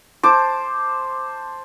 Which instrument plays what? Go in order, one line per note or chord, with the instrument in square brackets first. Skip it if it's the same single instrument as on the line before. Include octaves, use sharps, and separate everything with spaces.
[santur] C5 A5 D6